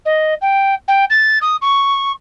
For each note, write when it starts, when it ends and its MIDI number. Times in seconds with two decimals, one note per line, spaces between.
0.05 0.34 75
0.41 0.74 79
0.88 1.05 79
1.10 1.38 93
1.41 1.56 87
1.61 2.12 85